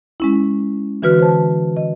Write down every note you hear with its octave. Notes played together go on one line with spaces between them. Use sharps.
G#3 C#4 E4
D3 E3 F#4 B4 F6
C5 A5
D#5